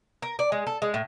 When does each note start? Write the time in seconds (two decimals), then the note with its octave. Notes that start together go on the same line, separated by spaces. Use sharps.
0.22 A#4
0.39 D5
0.52 G#3
0.67 A4
0.82 G#3
0.94 A2